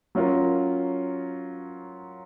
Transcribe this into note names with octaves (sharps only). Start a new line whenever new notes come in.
F#3 C#4 F4 A#4